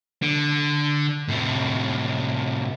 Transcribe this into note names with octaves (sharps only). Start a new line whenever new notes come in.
D3
A2 C3